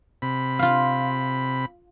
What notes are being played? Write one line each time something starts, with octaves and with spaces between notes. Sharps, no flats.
C3 B5
F4 F5